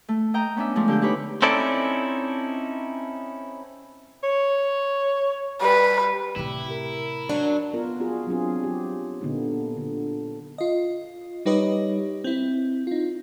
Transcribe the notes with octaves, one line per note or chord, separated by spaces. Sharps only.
A3
D#5 G5 A#5
B3 C#4 D4 E5
F3 G#3 A3 D4
D3 G4 G6
D#4 G4 B4 C#5 B5
C4 C#4 D#4 E4 A4 D5
C#5
G3 B4
A2 C3 E4 G4
A#4
F#3 D4
B3 F4 A#4
F4 F#4 G#4
F#3 C4 D4 F4 G#4
F#3 G4
A#2 D3 A#3 B3 D#4
D3
F4 D#5
G3 D#4 G4 B4 C#5 D#5
C4 E4
D#4 F4